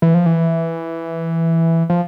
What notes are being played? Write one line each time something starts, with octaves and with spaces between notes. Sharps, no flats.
E3
F3
E3
F3